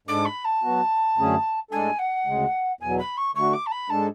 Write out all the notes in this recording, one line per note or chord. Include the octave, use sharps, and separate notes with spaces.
G#2 G#3 D4 A4 D6
B5
A5
F#3 B3 F#4
F#2 D3 A3 C#4 G#4
A2 G#3 D4 A4 G#5
F#5
D2 C#3 G#3
E2 B2 F#3 G#5
B5
C#6
D3 A3 D4 F#4 C#6
D6
A5
B5
G#2 G#3 D4 A4 A5